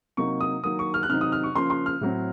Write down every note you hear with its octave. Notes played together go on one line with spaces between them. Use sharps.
C3 F#3 A#3 D#4 C#6
D#6
D#3 F#3 A#3 D#6
C#6
F6
F#6
C3 D#3 F#3 C4 D#4 F6
D#6
F6
C#6
C#3 F3 A#3 C#4 C6
C6
F6
A2 F#3 C4